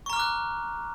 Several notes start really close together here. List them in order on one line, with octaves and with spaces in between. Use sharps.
C#6 A#5 F6 D6 F#6